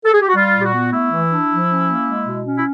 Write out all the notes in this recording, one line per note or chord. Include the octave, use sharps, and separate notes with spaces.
A4
G#4
G4
F#4
G3 F4
A#2
G4
F#4
B3
A3 E4
E3
D4
F3
C#4
A#3
G#3
B2
C#4
E4